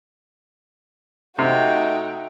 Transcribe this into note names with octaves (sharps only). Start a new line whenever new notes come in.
C3 A3 D#4 F#4 G5